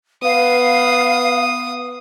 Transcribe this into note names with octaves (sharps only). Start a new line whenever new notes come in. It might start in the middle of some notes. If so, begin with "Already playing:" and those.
B3 F5 D#6